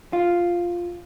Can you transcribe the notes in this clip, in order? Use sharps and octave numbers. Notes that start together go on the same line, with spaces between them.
F4